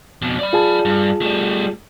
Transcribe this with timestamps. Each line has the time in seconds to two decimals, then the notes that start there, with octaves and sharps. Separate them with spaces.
0.22 F2 B2
0.39 D5 B5
0.53 F4 G#4 A5
0.85 G2
1.22 G3 A3